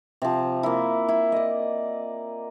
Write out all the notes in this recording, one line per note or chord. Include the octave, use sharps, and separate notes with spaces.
C3 F3
A#3 E4
E4
D5 D#5